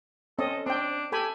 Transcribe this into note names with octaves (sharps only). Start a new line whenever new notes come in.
C4 C#4 A4 D#5
C4 D4 G5
G4 A4 G#5 B5